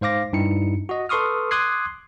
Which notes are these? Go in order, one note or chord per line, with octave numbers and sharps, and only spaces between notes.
G#2 C5 F5 D6 A#6
G2 D#4 E4 C#7
F#4 D#5
A4 B4 C6 C#6 D#6 F6
C6 D6 D#6 F#6 G#6 C7